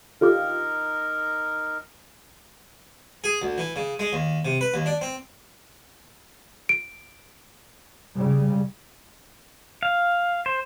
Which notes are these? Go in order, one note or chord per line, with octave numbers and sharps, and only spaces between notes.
D3 D#4 F4 G4 A#4
G#4
D2
E3
C#3
G#3
D#2
C3
B4
D#2
D4
C4
D7
C#3 G3
F5
C5